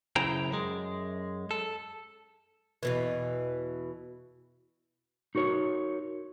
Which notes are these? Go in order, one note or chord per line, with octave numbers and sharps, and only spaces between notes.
F#2 C#3 E4 C5 G5 A#5
F#2 G#3
A4
E2 B2 E3
D#4 F#4 A#4 C#5